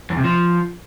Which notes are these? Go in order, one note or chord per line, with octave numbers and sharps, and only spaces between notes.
E2
C3
F3